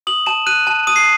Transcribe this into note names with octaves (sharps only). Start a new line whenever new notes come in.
D#6 F#7
A5 E7
F#6 D#7
A5
D#6 D#7
C7